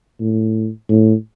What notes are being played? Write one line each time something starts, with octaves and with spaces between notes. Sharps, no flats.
A2
A2